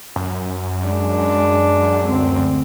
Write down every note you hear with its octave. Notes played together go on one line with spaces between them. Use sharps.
F#2
G#3 D4
D2 C4